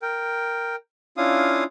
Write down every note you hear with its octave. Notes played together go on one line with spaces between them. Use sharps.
A#4 G5
C#4 D4 E4 F4 F5 D#6